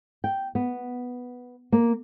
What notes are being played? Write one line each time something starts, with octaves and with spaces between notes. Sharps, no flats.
G5
B3
A#3